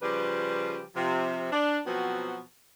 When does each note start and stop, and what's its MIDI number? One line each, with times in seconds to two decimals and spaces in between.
0.02 0.82 49
0.02 0.82 53
0.02 0.82 55
0.02 0.82 67
0.02 0.82 71
0.95 1.48 48
0.95 1.48 53
1.52 1.79 62
1.86 2.40 47
1.86 2.40 53
1.86 2.40 54
1.86 2.40 59
1.86 2.40 60
1.86 2.40 66